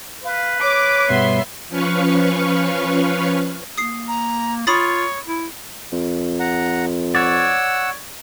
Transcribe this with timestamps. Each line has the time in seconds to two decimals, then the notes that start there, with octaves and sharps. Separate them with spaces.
0.24 B4 F5
0.62 C#5 D6
1.10 G2 B2 G3 B3 E5 C6
1.69 F3 C#4 B4 F5 C#6
3.78 A#3 D#6 C7
4.08 A#5
4.67 F4 C#5 B5 D#6 A6
5.27 E4
5.92 F2
6.40 F#5 A#5
7.15 C#5 D5 F#5 E6